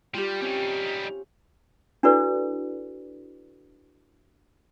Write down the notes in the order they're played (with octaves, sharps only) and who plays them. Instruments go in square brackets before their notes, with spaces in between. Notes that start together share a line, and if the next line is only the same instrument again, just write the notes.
[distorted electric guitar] G3 [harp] F4 G4
[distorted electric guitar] G3 D#4 [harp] C4 C#4
[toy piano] D4 E4 F#4 A4 B4 D5